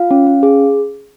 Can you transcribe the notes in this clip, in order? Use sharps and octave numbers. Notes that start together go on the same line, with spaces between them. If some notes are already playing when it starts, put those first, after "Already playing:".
Already playing: F4 F5
C#4
C#4
G#4